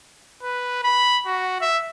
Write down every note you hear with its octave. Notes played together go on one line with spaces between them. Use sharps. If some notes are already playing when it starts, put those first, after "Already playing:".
B4
B5
F#4
E5